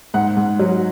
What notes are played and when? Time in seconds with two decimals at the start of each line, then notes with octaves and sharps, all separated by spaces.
0.14 G#2 F#5
0.37 G#2
0.59 F#3